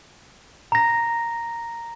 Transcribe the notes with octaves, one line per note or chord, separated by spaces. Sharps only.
A#5 A#6